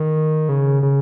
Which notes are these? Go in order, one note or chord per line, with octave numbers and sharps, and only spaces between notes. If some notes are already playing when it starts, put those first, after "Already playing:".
Already playing: D#3
C#3
C#3